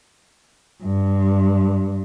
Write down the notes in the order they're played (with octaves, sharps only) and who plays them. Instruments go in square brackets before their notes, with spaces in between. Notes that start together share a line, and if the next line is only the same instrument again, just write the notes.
[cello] G2